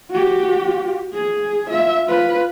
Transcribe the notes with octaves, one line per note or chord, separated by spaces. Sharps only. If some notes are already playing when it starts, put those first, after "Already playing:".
F#4 G4
G#4
F4 E5
F4 B4